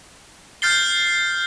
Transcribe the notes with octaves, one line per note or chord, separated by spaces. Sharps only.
F6 G6 A6 C7 G7